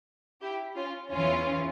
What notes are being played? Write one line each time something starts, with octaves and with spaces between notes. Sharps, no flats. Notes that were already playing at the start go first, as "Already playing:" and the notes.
E4 G4
C#4 F4
E2 E3 C#4 F4